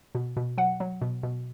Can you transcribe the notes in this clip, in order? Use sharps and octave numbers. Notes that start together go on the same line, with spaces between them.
B2
B2
F#3 F#5
F#3
B2
B2